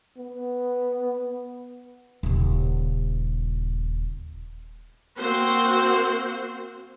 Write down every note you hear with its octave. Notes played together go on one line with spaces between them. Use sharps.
B3
D#1 C#3
A#3 C4 F#4 C5